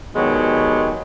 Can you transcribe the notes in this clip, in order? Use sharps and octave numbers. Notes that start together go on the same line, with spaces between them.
B2 D#3 F#3 G#3 D4 G4